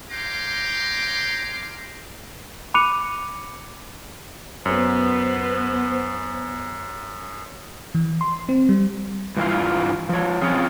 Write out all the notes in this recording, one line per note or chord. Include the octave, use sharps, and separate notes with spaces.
C#5 F5 G5 A#5 C6 D6
B5 D6 F#6 C#7 D#7 F7
F#2 B3 C5
E3
C6
C4
G3
G2 E3 D4 E4 F4 F5
F3 C#5
C4 C#4 F4 G#4